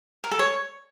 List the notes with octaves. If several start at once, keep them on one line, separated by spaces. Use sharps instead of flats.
A#4
A4
C#5